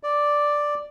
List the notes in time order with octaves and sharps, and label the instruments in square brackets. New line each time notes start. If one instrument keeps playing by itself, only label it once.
[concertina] D5